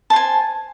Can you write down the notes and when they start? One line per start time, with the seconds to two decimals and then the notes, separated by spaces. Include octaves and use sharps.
0.10 A5
0.13 C5
0.16 G#5